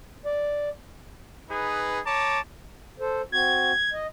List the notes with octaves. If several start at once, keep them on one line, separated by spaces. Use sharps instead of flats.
D5
D#4 G#4 B4
C#5 A5 A#5 D6
A4 C5
C4 F#4 G#6
D#5